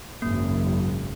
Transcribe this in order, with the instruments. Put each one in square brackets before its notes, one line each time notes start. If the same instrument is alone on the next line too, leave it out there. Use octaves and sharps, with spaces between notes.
[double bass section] G#1 F#2 C#3 [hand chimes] A#3